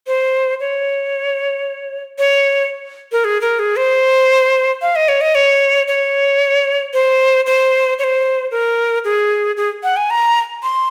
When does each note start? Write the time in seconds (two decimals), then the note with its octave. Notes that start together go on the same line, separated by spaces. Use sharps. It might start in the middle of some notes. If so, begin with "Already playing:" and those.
0.07 C5
0.60 C#5
2.18 C#5
3.12 A#4
3.24 G#4
3.41 A#4
3.59 G#4
3.76 C5
4.82 F5
4.96 D#5
5.08 C#5
5.21 D#5
5.35 C#5
5.88 C#5
6.93 C5
7.46 C5
7.99 C#5
8.04 C5
8.51 A#4
9.04 G#4
9.57 G#4
9.83 F#5
9.97 G#5
10.10 A#5
10.63 C6